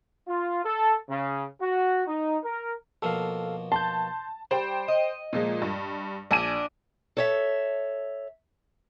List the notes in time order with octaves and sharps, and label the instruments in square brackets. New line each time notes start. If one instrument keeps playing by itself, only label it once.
[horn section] F4
A4
C#3
F#4
D#4
A#4
[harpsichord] B2 F3 A#3 [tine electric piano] A4 F5
[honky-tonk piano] A5 [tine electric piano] C6 G6
[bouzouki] G3 [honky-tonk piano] C5 G5
[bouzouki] D#5
[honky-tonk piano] A#2 F3 G#3
G2
[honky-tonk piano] A#1 G#5 D#7 [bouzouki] D4
[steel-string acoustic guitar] A4 C#5 E5